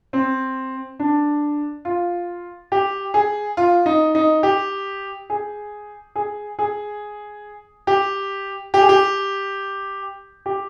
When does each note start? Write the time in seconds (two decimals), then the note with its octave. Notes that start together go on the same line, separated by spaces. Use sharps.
0.13 C4
0.99 D4
1.85 F4
2.72 G4
3.14 G#4
3.57 F4
3.86 D#4
4.15 D#4
4.43 G4
5.30 G#4
6.15 G#4
6.59 G#4
7.87 G4
8.74 G4
8.81 G#4
8.89 G4
10.46 G4